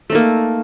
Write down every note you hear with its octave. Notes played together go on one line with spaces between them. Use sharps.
A3 A#3 D#4